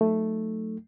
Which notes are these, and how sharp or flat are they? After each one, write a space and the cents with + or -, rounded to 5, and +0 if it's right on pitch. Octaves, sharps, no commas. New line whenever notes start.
F#3 -35 A3 +0 D#4 +0